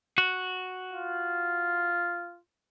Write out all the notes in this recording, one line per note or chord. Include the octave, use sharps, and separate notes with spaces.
F#4
F4